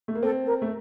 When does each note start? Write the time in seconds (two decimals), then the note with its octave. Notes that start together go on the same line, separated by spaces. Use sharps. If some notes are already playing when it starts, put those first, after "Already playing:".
0.08 A3
0.15 A#3
0.23 C4 A4
0.46 A#4
0.62 A3